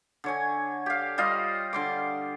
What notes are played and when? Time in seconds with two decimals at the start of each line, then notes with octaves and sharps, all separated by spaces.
0.24 D3 C#5 G#5
0.86 G4 F5
1.18 G3 F4 D#5 F5
1.73 D3 C6 D6